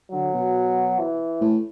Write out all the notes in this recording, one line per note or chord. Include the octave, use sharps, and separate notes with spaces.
D3 F#3
B2
E3
A2